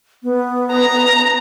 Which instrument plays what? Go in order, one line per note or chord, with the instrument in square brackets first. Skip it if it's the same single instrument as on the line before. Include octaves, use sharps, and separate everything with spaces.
[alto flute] B3
[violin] A#5